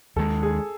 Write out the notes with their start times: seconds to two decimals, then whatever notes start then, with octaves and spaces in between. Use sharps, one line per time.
0.16 D#2 D#3 G#3 A4
0.43 G#4